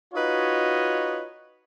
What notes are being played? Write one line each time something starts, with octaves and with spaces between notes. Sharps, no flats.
D#4 F4 F#4 B4 C#5 D#5